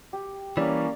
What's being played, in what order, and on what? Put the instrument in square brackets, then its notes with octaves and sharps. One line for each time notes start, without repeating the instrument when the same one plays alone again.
[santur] G4
[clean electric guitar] E3 G3 [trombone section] A#3 C#4 [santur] D5